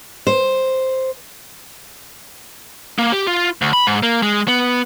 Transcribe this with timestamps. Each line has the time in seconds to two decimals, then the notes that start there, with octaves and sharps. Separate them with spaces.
0.27 C5
2.98 A#3
3.12 G4
3.27 F4
3.62 D2
3.73 B5
3.87 G#2
4.03 A#3
4.23 G#3
4.48 B3